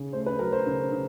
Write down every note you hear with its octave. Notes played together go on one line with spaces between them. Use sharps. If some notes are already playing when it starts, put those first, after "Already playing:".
Already playing: C#3
A3 C5
B4
F#3 A#4
C5
C#3
C#3